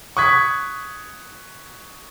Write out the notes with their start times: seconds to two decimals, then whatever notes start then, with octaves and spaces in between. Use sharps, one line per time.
0.17 C#6 D#6 F#6 G#6 B6